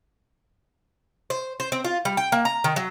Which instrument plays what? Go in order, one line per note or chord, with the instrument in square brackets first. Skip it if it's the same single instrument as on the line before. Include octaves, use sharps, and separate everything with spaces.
[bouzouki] C5
C5
C4
F4
G3
G5
A#3
A#5
D#3
F#3